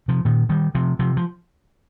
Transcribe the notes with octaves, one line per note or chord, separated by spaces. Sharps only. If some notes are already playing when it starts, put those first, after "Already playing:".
C3 F3
A#2 D#3
D#3 G3
C3 F3
C3 F3
F3